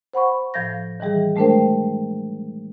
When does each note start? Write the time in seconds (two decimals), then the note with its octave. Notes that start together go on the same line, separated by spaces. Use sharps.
0.14 C5 F#5 B5 C#6
0.54 A2 F3 F5 G6 A#6
1.00 D#3 E3 G3 G#4
1.36 G#3 A3 D4 A#4 C5 G5